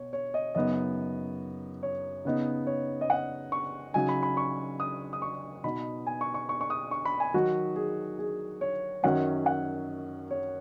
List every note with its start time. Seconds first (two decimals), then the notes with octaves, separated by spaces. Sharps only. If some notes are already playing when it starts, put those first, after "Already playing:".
Already playing: B2 C#5
0.13 C#5
0.34 D#5
0.55 F#2 C#3 B3 D#4 D#5
1.83 C#5
2.25 C#3 B3 D#4
2.67 C#5
3.01 D#5
3.10 F#5
3.52 C#6
3.94 C#3 F#3 D#4 G#5
4.09 B5
4.23 B5
4.37 C#6
4.80 D#6
5.13 D#6
5.22 C#6
5.64 B2 B3 D#4 B5
6.07 G#5
6.21 C#6
6.34 C#6
6.49 C#6
6.61 C#6
6.70 D#6
6.91 C#6
7.05 B5
7.20 G#5
7.34 D#3 F#3 D#4 F#4
7.76 G#4
8.19 G#4
8.61 C#5
9.03 F#2 D#3 F#3 C#4 F#5
9.46 F#5
10.31 C#5